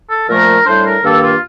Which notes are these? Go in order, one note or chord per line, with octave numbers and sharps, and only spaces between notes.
A4
A#2 F3 A3 A#4
A2 G3 D4 C5
A#4
G2 D#3 A#3 A4
F4